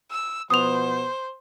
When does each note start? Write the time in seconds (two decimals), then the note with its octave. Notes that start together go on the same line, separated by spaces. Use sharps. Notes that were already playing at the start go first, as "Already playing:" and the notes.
0.11 E6
0.50 B2 F3 B3 C5 D#6 F7